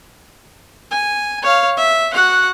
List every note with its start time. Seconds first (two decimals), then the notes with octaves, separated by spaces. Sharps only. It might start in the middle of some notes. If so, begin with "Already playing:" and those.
0.91 G#5
1.42 C#5 F5
1.77 E5
2.13 F#4 F#5